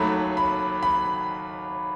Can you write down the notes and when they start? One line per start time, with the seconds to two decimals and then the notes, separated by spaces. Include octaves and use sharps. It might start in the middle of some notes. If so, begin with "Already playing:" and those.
Already playing: D#2 D#3 F#3 A3 B5
0.37 B5
0.83 B5